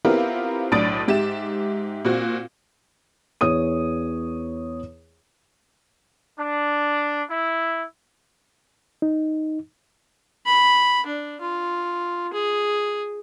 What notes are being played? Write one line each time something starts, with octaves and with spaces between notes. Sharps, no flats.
B3 C4 E4 F4 G4 A#4
B1 A2 D4 D#6 A6 D7
G#2 G4 E5 E7
A#2 C4 F#4
E2 C#5 D#6 D#7
D4
E4
D#4
B5
D4
F4
G#4